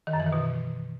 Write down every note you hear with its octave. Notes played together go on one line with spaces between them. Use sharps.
D#3
F#2
E3
D#3
B2